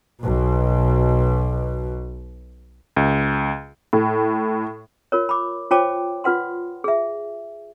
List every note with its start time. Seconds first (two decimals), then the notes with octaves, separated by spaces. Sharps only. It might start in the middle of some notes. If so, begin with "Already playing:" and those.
0.22 B1 B2
2.96 C#2
3.93 A2
5.12 F4 A#4 C#5
5.29 B5 D6
5.71 F4 C5 C#5 G5 A5 D6
6.24 F4 B4 F#5 C6
6.84 G#4 E5